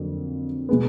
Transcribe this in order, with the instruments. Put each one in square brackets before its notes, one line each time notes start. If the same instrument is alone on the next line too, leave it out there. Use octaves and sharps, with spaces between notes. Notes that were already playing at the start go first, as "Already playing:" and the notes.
Already playing: [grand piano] F2 D3 F#3 A#3
B2 G#3 B3